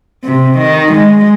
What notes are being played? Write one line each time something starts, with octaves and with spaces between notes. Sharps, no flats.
C3
D#3
G#3